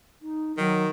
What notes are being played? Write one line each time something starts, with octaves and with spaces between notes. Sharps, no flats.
D#4
D#3 F#3